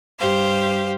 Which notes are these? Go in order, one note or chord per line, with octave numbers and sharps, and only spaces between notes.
G2 G4 C5 F5